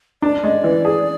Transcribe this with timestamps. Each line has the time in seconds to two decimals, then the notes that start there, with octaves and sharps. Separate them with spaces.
0.22 D4 D5
0.44 G#3
0.64 E3
0.85 G#4